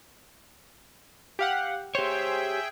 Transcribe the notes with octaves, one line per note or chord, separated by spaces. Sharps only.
G4 F5 F#5
G4 G#4 C5 C#5 E5 G5